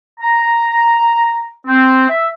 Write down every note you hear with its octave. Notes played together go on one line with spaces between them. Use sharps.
A#5
C4
E5